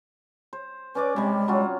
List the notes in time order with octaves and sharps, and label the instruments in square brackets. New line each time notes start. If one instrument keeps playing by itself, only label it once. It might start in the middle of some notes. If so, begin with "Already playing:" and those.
[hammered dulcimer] C5
[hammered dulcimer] C#4 D5 D6 [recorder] B4
[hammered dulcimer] C3 G3 [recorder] G#3
[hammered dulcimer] F#3 C#4 F4